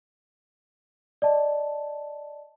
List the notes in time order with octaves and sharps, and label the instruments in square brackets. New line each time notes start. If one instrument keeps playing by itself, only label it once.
[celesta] D5 D#5 A5